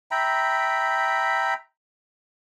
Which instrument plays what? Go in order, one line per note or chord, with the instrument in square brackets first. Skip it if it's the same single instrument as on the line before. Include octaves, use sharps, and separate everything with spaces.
[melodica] E5 G5 A#5 B5